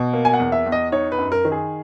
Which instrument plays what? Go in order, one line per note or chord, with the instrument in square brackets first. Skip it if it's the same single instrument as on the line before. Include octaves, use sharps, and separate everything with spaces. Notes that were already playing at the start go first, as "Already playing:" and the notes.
Already playing: [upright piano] B2
A#3
G#5
F#5
E2
E5
E2
D#5
D#4 C#5
B4
F#2
A#4
D#3
G#4